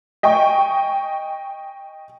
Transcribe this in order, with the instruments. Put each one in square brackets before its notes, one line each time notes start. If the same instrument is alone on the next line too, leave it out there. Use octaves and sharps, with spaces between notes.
[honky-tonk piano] D#5 G5 G#5 C#6